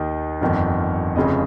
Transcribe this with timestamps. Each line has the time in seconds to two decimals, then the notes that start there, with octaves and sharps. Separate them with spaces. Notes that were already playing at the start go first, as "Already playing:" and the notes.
Already playing: D#2 D#3
0.41 G1 F2 D#3
1.16 F1 F2 C#3 D#5